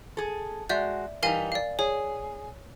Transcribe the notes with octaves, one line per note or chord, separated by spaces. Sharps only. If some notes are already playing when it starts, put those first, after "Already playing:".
G#4 A4
G#3 F#4 D5 E5 G6
E3 G3 D#4 A#4 F5 G#5
D5 F5
G#4 C#5